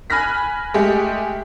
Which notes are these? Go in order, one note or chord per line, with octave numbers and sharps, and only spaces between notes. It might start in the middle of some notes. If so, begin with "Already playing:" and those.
G#5 B5 F6 F#6 A#6 B6
G#3 A3 G4